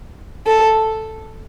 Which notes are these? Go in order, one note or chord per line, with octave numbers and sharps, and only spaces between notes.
A4